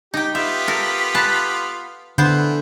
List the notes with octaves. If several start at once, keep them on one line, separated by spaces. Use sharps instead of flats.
D#4 G4 G5
B3 F4 G4 E5
A4 A#4
B4 A5
D3 E3 B3 C5